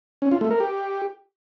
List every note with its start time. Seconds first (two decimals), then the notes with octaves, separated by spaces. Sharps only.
0.22 C#4
0.31 F4
0.41 A3
0.51 A#4
0.60 G4